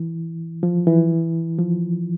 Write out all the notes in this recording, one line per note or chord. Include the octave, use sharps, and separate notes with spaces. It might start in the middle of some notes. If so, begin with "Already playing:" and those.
Already playing: E3
F3
E3
F3